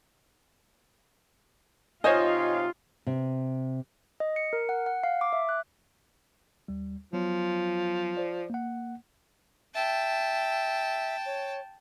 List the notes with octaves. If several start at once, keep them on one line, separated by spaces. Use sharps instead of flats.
C3 D#4 F4 C5 C#5 D#5 F5 G#5
C3
D#5
C#7
A#4
F#5
F#5
F5
D6
E5
F#6
D#2 G3
F3 F#3 B3 C#5
C5 D5
A#3 F#5
E5 G5 A5
C#5